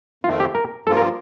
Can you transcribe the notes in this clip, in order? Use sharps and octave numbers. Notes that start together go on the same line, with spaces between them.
F2 D#3 A3 C4 F4
G4
A#4
G2 F3 A#3 F4 A4
A#4